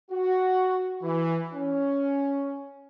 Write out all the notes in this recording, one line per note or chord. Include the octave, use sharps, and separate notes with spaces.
F#4
E3
C#4